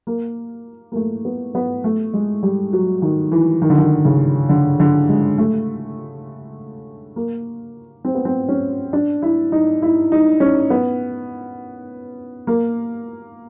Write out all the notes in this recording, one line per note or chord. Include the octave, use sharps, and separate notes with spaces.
A#3
A#3
A3
B3
B3
A3
G#3
G3
F#3
D#3
E3
D#3
D3
D#3
C#3
D3
D3
G#3
A3
A#3
C4
B3
C4
C#4
D4
E4
D#4
E4
D#4
C#4
B3
A#3